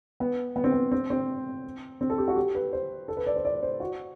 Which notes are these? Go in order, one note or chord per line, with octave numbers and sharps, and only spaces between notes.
B3
B3
C4
B3
C4
C4
C4
A4
G4
F#4
G4
B4
C5
A4
B4
D5
C5
D5
C5
F#4